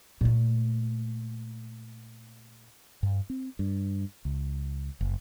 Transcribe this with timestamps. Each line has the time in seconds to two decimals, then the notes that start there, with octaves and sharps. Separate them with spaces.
0.21 A#2 A3
3.03 G2
3.30 C4
3.59 G2
4.25 C#2
5.01 F#1